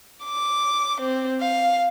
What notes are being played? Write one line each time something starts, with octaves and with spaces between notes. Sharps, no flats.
D6
C4
F5